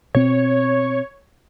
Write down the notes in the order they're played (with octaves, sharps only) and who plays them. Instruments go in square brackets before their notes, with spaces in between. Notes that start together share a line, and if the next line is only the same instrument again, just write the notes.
[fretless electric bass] B2 C4 [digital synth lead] C#5